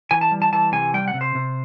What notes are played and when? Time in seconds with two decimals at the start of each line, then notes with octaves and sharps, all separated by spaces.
0.11 E3 G#5
0.21 A5
0.31 G3
0.42 A5
0.53 E3 A5
0.72 C3 G#5
0.94 G3 G5
1.08 F#5
1.14 C3
1.21 C5
1.35 C3